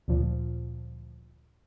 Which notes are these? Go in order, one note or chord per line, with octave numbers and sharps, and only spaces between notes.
D2 A#2 F3